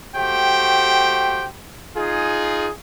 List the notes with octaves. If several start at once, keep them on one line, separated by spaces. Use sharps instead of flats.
A3 F#4 G4 C5 G5
D#4 F4 G#4